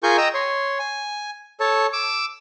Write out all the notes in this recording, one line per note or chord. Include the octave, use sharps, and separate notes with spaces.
F4 G#4 A#4 G#5 C#6 G6
D#5 G5 A#5 D#6 E6
C#5 C6
G#5
A4 C#5 A5
D6 E6